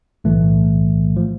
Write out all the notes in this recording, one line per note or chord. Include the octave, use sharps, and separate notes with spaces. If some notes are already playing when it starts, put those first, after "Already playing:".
B1 A2 E3 A3
F3